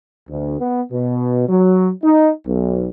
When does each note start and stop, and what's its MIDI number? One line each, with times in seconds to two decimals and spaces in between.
0.29 0.57 38
0.60 0.80 59
0.90 1.47 47
1.49 1.90 54
2.03 2.31 63
2.47 2.89 35